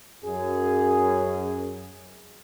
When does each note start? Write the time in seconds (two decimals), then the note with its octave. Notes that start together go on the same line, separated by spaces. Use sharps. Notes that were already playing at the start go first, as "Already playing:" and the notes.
0.25 F#2 G#4